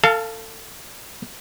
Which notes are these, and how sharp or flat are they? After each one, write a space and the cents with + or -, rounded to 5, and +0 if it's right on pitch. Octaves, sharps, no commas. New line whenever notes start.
A4 +30 F5 -10 A5 -25